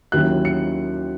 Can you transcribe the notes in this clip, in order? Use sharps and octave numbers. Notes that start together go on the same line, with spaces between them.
D#2 D#3 F#3 C#4 E4 F#6
C#7